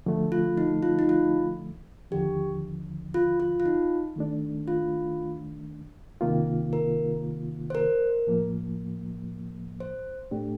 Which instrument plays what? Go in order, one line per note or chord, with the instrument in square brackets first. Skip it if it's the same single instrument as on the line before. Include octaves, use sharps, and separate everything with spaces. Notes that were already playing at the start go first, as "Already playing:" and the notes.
[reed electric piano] D3 F3 A3
[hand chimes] F4
D#4
F4
D#4
F4
[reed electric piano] D#2 D3 F3 [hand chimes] G4
[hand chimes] F4
F4
F4
D#4
[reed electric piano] D#3 A3 D4
[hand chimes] F4
[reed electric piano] C2 C3 D#3 A#3 F4
[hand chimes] A#4
C5
A#4
[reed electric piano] A2 F3 A#3
[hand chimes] C5
[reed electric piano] A2 A3 D4 G4